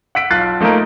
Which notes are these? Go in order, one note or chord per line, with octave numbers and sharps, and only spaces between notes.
F#5 E6 B6 D7
B1 F4 F#6 A6 C7
F3 A3 A#3 D#4 A#4